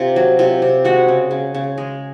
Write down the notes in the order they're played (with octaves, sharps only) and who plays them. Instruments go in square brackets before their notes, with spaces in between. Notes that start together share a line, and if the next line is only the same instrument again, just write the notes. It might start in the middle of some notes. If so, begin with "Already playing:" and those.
Already playing: [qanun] C3 F4
F#3
C3 F4
C3
G#3 F#4
C#3
C#3
C#3
G#3